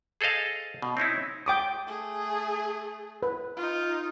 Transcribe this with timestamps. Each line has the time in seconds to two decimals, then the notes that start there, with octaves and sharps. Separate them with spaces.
0.21 G#4 A4 C5 D#5 F5
0.82 B2
0.97 C4 C#4 D#4 E4
1.46 G5 D6 D#6
1.87 A3 G#4
3.23 B4
3.56 D#4 F4